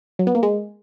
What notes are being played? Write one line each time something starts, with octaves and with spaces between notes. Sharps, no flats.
F#3
B3
A#3
G#3